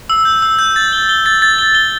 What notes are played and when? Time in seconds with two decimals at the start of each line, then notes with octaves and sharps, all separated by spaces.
0.10 E6
0.25 G6
0.42 E6
0.59 G6
0.76 A6
0.93 G7
1.09 G7
1.26 A6
1.42 A6
1.59 G7
1.75 G7